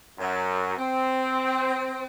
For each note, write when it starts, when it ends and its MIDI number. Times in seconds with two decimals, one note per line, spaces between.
0.18 0.75 42
0.77 2.05 60